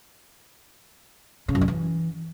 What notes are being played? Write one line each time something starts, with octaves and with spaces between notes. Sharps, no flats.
C#3
F#2
D3
E3